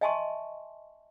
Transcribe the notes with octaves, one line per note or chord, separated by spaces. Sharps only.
D#5 E5 G#5 A5 C6 C#6